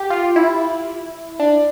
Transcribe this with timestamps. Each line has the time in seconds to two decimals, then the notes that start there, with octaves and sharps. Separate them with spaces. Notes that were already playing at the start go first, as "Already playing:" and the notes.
Already playing: G4
0.10 F4
0.36 E4
1.40 D4